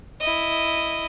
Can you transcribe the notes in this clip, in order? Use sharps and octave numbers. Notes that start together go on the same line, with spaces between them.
E4 D#5